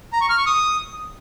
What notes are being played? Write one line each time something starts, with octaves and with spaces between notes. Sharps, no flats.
A#5
C#6
F6
C#6
D#6